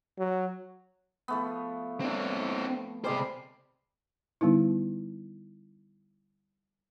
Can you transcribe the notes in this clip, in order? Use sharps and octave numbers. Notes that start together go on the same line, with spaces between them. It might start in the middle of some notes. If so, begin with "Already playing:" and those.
F#3
F3 A3 B3
C4 D4
C3 G3 G#3 C5 D5
D3 G3 B3 D#4 E4